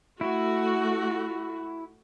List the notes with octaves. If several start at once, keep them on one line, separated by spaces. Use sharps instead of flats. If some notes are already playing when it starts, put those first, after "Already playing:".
A3 E4 F#4